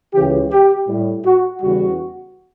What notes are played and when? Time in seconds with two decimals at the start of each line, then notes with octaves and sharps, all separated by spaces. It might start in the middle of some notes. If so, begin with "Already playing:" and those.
0.14 C#2 C#3 E3 G4
0.51 G4
0.88 A2 G3
1.26 F#4
1.62 E2 C#3 G3 F#4